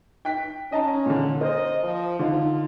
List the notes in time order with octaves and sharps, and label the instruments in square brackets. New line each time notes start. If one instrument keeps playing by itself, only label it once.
[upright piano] G5 F#6 B6
[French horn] C#4 [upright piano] D#5 A5 A#5
[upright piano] A#2 D3
[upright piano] A#4 C5 D5 [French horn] D#5
[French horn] F3
[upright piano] D3 D#4 [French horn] F4